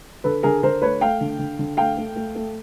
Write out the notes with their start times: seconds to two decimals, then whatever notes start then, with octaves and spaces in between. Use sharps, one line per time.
0.24 D3 A4 B4
0.43 D3 G#4 A#4
0.63 D3 A#4 C5
0.81 A3 B4 C#5
1.01 A3 F5 G5
1.21 D3
1.39 D3
1.59 D3
1.77 A3 F5 G5
1.97 A3
2.16 A3
2.35 A3